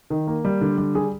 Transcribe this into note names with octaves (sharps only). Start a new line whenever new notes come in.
D#3
A#3
G3
D3
G3
G3 G#4